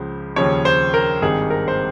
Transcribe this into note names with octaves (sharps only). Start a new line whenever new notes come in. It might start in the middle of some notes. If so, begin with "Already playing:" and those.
Already playing: C#2 C#3 F3
D#2 C#3 F3 C#5
C5
A#4
G#1 G2 D#3 G#4
A#4
C5